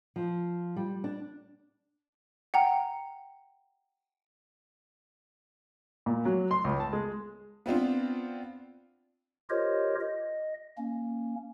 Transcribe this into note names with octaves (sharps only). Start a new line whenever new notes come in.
F3
G3
D4
F#5 G5 A#5
A#2
F#3
C6
C#2
A5
G#3
B3 C4 D4 F4
F4 G4 A#4 C5 C#5 D#5
D#5
A#3 C#4